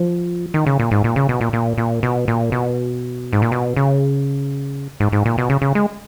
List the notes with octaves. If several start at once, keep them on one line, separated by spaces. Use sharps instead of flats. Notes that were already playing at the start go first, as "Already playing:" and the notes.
Already playing: F3
D#3
C#3
A#2
G#2
A#2
C#3
B2
A#2
A#2
A#2
B2
A#2
B2
G#2
A#2
B2
C#3
G#2
G#2
A#2
B2
C#3
C#3
G#3